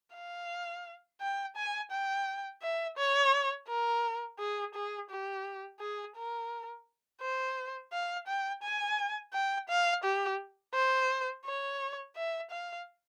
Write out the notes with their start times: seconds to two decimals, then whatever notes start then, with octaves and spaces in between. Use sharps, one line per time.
0.15 F5
1.21 G5
1.56 G#5
1.92 G5
2.62 E5
2.98 C#5
3.68 A#4
4.39 G#4
4.74 G#4
5.10 G4
5.80 G#4
6.16 A#4
7.21 C5
7.92 F5
8.27 G5
8.63 G#5
9.33 G5
9.69 F5
10.04 G4
10.74 C5
11.45 C#5
12.16 E5
12.51 F5